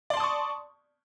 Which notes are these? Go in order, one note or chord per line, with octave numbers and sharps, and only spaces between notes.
D5 A5 C6 C#6 D#6